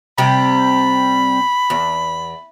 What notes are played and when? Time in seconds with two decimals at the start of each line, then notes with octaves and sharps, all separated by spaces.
0.18 C3 G3 B5
1.70 E2